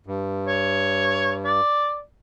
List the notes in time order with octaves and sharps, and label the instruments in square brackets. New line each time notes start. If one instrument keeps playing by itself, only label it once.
[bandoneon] G2
[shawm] C#5
D5